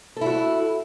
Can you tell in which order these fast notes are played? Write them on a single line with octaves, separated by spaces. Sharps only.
A4 E4 F#4